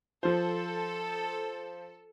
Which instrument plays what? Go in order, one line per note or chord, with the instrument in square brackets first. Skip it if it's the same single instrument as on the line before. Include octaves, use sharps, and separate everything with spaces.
[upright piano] F3 C5 [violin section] A4